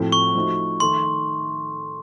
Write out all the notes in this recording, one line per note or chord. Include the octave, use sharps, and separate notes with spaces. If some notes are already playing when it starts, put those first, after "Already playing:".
Already playing: A2 F3 C4 F#4 A4
C#6
F3 A3 D#4 F#4
D#3 A3 D#4 A4 C6